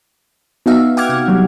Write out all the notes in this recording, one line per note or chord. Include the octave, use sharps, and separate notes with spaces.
B3 D#4 F#4 E5 F5
F#5 G5 D6 F6 G#6
C3 F#5
F#3 G3